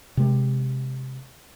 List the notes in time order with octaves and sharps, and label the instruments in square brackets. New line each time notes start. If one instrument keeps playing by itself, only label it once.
[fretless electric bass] C3 G#3